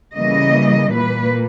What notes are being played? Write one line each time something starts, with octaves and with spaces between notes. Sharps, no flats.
C#3 E3 G3 A#3 D#5
A#2 A#3 B4